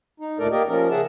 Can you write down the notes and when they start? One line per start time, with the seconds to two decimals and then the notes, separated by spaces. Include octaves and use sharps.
0.20 D#4
0.39 D2 A#2 A3 A4 A#4 D5
0.51 A#3 G4 A#4 D5 D#5
0.68 F3 C#4 A#4
0.91 C#3 G#4 E5 F#5 A5